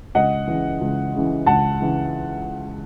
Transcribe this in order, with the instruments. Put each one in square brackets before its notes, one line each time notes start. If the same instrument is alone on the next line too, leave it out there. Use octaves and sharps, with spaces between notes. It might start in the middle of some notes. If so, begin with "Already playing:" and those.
[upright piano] C#2 D#5 F#5
C#3 E3
C#2
C#3 E3
C#2 F#5 A5
C#3 E3